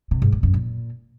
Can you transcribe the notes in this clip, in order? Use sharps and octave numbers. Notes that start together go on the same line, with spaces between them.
C3
G#2
A#2
F#2
A#2